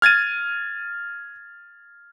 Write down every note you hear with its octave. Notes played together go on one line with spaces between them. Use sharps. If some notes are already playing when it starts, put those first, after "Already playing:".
F6 G#6 A6 D#7